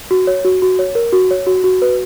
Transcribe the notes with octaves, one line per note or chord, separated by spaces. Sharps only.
F#4
C#5
F#4
F#4
C#5
A#4
F#4
C#5
F#4
F#4
B4